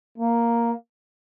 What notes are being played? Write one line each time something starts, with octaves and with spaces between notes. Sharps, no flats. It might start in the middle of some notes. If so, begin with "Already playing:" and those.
A#3